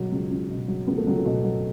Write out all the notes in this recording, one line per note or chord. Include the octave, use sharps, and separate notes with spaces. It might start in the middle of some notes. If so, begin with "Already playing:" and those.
Already playing: B2 F#3
C#2
C#2
B2
F#3
C#2 B3
A3
C#2 F#3
A3
B2
F#3